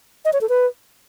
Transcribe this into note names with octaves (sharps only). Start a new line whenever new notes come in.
D#5
C#5
A4
B4